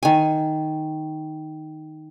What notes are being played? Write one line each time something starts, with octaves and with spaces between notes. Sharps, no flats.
D#3 G#5